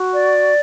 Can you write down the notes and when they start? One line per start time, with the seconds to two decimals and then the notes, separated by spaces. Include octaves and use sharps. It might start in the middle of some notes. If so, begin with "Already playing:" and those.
Already playing: F#4
0.13 D5